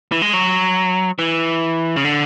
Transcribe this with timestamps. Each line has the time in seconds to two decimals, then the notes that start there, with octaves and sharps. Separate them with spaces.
0.12 E3
0.22 G#3
0.33 F#3
1.19 E3
1.96 C#3
2.05 D3